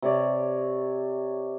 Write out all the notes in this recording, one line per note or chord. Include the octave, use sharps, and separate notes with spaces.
C3 C#5 D5